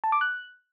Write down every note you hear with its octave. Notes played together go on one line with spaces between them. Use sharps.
A5
D6
F#6